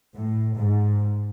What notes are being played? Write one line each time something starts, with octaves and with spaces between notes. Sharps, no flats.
A2
G#2